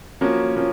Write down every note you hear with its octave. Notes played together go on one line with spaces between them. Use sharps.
F3 A#3 C#4 F#4
F3 A#3 C#4